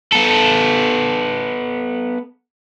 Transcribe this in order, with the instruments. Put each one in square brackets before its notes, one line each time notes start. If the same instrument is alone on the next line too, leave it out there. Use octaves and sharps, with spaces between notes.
[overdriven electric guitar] B3 A4